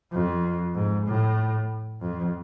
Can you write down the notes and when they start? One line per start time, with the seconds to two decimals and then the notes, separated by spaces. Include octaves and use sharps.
0.12 F2
0.75 G#2
1.07 A2
2.01 F2